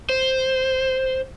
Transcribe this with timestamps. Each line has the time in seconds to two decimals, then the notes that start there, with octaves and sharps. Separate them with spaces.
0.09 C5